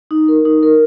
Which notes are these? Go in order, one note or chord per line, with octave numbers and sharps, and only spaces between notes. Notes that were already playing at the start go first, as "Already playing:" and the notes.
D#4
A#4
D#4
A#4